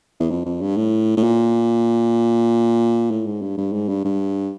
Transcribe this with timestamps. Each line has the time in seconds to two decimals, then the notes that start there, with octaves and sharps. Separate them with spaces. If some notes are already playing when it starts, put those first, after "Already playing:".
0.20 E2
0.30 F2
0.45 F2
0.61 G2
0.77 A2
1.17 A2
1.23 A#2
3.11 A2
3.26 G#2
3.42 G2
3.58 G2
3.73 G#2
3.89 G2
4.05 G2